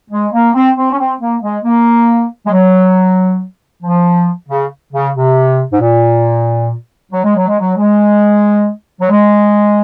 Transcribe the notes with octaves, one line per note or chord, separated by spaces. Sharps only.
G#3
A#3
C4
C4
C#4
C4
A#3
G#3
A#3
G#3
F#3
F3
C#3
C#3
C3
G#2
A#2
F#3
G#3
F#3
G#3
F#3
G#3
F#3
G#3